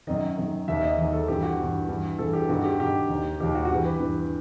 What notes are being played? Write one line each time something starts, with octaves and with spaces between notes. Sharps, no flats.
F#2 D#3 D#5
F#2 D#3
D#2 D#3 E5
D#5
D#2 D#3
A4
G2 E3 G4
F#4
G2 E3
G2 E3
G2 E3 A4
G4
G2 D#3 F#4
G4
G2 D#3 G4
D#2 D#3
D#2 D#3 G4
F#4
F#4
G2 E3 G4
B4
G2 E3